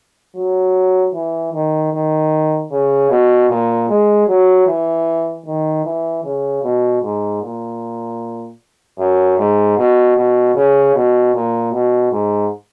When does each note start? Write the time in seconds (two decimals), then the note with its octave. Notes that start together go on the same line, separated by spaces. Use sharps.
0.36 F#3
1.14 E3
1.53 D#3
1.93 D#3
2.71 C#3
3.10 B2
3.49 A#2
3.89 G#3
4.28 F#3
4.67 E3
5.46 D#3
5.85 E3
6.24 C#3
6.63 B2
7.03 G#2
7.42 A#2
8.99 F#2
9.38 G#2
9.77 B2
10.17 B2
10.55 C#3
10.95 B2
11.34 A#2
11.72 B2
12.12 G#2